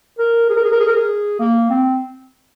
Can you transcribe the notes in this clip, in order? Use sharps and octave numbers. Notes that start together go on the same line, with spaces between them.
A#4
G#4
A#4
G#4
A#4
G#4
A#4
G#4
A#3
C4